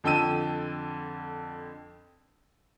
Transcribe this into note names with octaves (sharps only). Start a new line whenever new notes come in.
F2 D3 G5 A5 E6 D#7